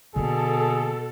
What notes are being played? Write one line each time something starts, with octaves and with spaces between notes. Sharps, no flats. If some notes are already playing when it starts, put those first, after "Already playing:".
B2 D3 A#3 G#4 A4